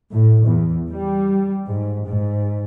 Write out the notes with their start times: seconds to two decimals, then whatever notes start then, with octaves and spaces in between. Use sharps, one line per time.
0.11 A2
0.47 E2
0.90 G3
1.67 G#2
2.07 G#2